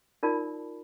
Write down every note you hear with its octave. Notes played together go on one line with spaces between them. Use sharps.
D#4 F4 A#4 D5 A5 B5